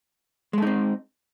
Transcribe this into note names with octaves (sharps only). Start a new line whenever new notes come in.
G#3 A3 C4 D#4